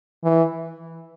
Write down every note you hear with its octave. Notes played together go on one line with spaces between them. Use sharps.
E3